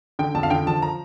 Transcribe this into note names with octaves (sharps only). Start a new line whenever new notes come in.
D3 G5
F2 A5
F5
D3 G5
F3 A5
A#5